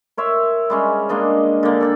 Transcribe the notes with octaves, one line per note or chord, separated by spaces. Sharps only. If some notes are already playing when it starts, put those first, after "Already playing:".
A#4 C#5 E5 C6
G3 G#3 C#4
G#3 A#3 D4 D#5
D3 A#3
A4 D5 G5